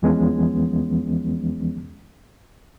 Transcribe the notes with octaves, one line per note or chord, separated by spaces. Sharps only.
E2 E3 F3 G#3 B3 C#4